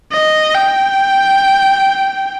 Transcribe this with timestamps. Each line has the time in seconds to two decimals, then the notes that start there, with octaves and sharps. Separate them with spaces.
0.12 D#5
0.55 G5